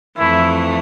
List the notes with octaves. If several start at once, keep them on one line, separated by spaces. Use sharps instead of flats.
F2 E3 A3 E4